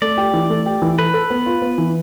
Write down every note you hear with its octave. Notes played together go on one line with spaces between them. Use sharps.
A3 D5
G4
E3
A3
G4
E3
A4 B4
A4
B3
F4
B3
E3